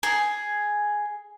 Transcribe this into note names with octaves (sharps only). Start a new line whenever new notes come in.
G#4